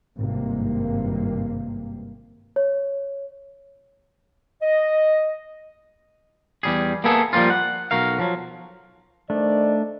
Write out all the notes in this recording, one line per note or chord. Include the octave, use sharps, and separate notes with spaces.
G#1 G2 C3 A#3
C#5
D#5
E2 G3 G#4
A#3 B3 E4 G#4 A4
F3 G3 A#3 C#4 F4
F#5
B1 F#4 A#4 F5
F3 F#3
D#3 A3 D4 C5 D5